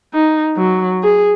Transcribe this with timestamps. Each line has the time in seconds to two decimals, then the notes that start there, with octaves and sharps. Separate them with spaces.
0.14 D#4
0.57 F#3
1.04 G#4